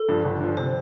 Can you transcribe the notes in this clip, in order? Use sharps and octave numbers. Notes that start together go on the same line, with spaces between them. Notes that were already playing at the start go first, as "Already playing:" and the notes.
Already playing: A4
G2 F3
G1
G2 F3
C3 C5